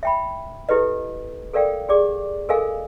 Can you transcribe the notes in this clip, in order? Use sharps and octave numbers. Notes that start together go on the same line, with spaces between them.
E5 G5 B5
E4 G4 A4 B4 D#5
A4 A#4 D5 F5 G5
G4 G#4 D5 D6
A4 A#4 D#5 F5 G#5